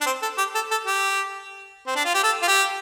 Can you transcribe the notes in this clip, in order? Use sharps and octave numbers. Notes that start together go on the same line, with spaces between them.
D4
C4
A4
G4
A4
A4
G4
C4
D4
F4
G4
A4
F4
G4